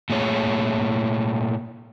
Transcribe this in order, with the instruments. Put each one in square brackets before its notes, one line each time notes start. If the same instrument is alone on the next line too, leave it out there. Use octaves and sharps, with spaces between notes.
[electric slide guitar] A#2 A3 G#4 C#5